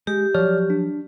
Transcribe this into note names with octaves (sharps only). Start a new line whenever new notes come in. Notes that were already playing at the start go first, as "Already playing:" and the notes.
G#3 G4
F3 F#3 C#5 D5 F6
D4